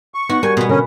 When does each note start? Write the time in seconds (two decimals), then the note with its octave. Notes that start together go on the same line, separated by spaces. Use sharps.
0.14 C#6
0.29 B3 D#4 F#4
0.43 G3 A#4 G#5
0.57 B2 B3
0.69 D3 C#4 A#4